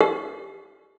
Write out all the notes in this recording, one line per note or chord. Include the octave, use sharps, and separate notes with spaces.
G4